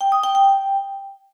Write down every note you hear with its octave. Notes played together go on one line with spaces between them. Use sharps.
G5
D#6
G5
G5